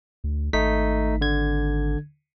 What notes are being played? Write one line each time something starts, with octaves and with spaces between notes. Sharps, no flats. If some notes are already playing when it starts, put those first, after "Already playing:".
D2
G#1 A3 D#4 B6
D3 G#6